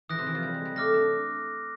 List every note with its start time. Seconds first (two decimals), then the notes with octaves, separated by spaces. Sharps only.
0.09 E3 D#6 F#6 A#6
0.19 C3
0.26 E3
0.35 F3
0.43 G3
0.54 G#3
0.65 G3
0.76 A3 D6 F6 A#6
0.94 D4